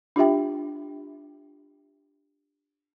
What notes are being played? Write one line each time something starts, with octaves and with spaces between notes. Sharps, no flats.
D4 F4 G4 E5 G5